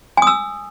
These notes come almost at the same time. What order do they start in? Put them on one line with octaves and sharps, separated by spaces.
G#5 D#6 E6